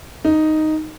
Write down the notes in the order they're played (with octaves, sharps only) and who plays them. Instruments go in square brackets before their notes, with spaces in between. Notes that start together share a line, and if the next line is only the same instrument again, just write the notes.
[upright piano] D#4